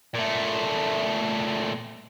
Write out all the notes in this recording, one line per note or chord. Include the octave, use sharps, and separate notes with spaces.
A#2 A3